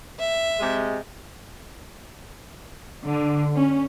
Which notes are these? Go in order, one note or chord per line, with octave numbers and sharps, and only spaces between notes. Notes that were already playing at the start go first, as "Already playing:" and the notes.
E5
C3 G#3
D3
C#4